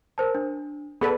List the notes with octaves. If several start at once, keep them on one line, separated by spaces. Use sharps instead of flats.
A#4 C5 A5
D4
B3 G#4 A4 B4 D5